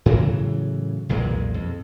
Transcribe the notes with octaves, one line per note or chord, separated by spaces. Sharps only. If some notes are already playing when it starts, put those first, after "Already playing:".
A2 C#3 E3 F#3
B1 E2 A#2 G#3
F2